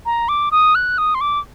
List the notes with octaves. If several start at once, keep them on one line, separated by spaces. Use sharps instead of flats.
A#5
D6
D#6
F#6
D#6
C6
D6